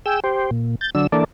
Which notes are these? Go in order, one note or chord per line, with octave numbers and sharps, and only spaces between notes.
G#4 G5 E6
G4 C5
A#2
G6 A6
D3 F#3 D4 E6
E3 A#3 D4 A4 D5